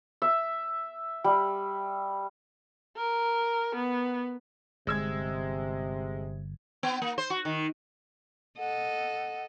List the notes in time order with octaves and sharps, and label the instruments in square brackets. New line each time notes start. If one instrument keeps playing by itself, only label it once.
[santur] E5
G3
[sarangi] A#4
B3
[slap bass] G1 [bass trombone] C3 [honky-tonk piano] G#3 E6 G#6
[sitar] B3
A#3
C5
F#4
D#3
[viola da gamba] A4 D#5 [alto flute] F#5